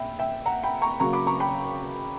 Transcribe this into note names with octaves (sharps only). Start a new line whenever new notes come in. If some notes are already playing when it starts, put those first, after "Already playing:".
Already playing: A#2 E5 G5 B5
E5 G5
F#5 A#5
G5 B5
A#5 C#6
C#3 F#3 A#3 A#5 C#6
B5 D6
A#5 C#6
G5 B5